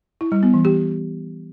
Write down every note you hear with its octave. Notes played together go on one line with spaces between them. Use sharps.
E4
G3
B3
E3
G4